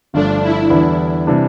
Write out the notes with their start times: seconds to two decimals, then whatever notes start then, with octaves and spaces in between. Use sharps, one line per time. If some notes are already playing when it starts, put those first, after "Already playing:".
0.13 G1 G2 F3 A3 D4
0.42 E4
0.70 E2 D3 G3 B3 E4
1.27 C3 E3 G3 D4